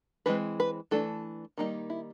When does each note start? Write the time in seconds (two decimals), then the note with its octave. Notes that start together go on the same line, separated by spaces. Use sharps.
0.26 E3 G#3 C4 B4
0.60 B4
0.91 E3 A3 D4 A4
1.58 D#3 G3 A#3 D#4
1.90 E4